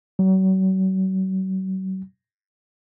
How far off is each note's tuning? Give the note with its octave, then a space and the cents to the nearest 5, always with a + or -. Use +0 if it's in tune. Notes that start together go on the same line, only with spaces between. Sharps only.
F#3 +40